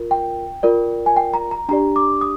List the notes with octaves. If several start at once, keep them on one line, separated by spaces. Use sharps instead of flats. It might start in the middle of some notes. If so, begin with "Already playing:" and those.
Already playing: F4 A#4
G5
F4 A#4 D5
G#5
G5
A#5
A#5
D4 G4 D5 A#5
D6
D#6